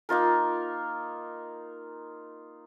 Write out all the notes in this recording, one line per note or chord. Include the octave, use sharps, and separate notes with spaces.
A#3 D#4 F4 A#4